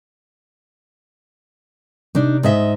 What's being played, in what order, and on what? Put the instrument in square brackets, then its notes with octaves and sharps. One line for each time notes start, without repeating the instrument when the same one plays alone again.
[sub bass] C3 [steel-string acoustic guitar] D4 D#4
[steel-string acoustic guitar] G#2 D#5 E5